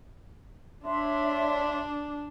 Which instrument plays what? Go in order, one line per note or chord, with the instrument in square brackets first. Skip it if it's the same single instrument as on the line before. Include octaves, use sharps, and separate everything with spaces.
[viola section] D4 [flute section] C#5 E5 C6